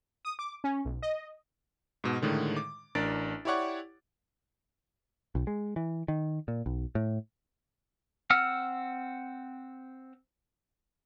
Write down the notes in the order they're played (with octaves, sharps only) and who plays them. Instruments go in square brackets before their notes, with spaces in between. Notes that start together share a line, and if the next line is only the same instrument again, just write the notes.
[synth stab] D#6
D6
C#4
B1
D#5
[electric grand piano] G#2 B2
A2 D3 D#3 G#3
D6
A1 D4 A#4 A6 D7
E4 G4 C#5 D5 F#5 C#6
[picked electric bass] B1
G#3
E3
D#3
A#2
B1
A2
[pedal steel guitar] C4 F#5 E6 F6